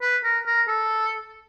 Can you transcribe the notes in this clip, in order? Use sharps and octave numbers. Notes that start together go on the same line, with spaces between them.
B4
A#4
A#4
A4